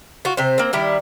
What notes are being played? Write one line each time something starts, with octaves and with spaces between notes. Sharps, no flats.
F4 F#4
C3 C5
A#3 C4
D#3 G3 E4